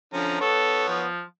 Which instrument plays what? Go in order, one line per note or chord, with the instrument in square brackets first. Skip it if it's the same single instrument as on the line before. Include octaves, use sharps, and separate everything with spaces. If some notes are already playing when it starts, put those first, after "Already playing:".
[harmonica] D3 C#4 A#5 [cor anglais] F3
[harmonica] B3 C#5 [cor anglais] A4
[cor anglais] F3